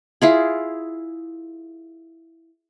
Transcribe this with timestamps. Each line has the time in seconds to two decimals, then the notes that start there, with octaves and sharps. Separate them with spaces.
0.22 E4 F4 G#4